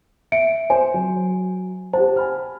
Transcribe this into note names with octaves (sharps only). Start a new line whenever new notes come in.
E5 C#7 D7
C5 G#5
F#3
G4 C5 F#5 A5
G#5 B5 F6